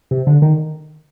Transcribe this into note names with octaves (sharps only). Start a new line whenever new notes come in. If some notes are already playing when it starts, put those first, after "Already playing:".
C3
D3
D#3